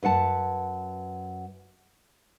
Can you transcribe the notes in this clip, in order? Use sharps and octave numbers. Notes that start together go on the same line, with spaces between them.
F#2 B4 F#5 A5